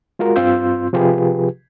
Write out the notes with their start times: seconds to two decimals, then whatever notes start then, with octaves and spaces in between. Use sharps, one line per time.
0.19 G#3 F4 F#4 A#4
0.36 G2 C4 F4 C6 E6 G6
0.93 C3 F3 F4 G4 G#4 B4